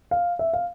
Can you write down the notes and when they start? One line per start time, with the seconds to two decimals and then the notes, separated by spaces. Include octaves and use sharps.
0.11 F5
0.39 E5
0.53 F5